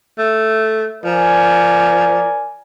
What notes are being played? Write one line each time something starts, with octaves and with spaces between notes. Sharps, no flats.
A3
F3 A#4 D5 G#5